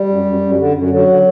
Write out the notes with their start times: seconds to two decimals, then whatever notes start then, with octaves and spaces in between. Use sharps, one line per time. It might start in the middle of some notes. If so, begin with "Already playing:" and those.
Already playing: G3
0.09 F#2
0.25 F#2
0.41 F#2
0.57 D3
0.75 F#2
0.90 D3 F#3
1.07 D3